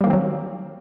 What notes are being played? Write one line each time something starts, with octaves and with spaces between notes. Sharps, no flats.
D#3 F#3 G3 A#3 C4